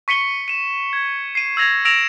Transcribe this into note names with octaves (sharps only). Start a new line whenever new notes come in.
C#6 B6 C#7 D#7 G7
D#7 E7
G#6
C7 D#7
E6 G#6 A#6 F7
E6 A#6 D7 E7 F7